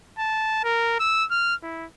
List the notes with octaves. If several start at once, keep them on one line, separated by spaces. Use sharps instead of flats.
A5
A#4
E6
F6
E4